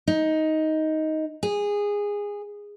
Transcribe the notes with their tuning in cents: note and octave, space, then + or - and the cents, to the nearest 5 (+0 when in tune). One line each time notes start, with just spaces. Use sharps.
D#4 +10
G#4 -15